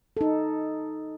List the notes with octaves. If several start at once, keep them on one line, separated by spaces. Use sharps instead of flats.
D#4 A4